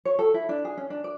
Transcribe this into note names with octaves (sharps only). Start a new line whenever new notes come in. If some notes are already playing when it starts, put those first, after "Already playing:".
C#5
A4
E4
D4
G#4
C#4
D4
D5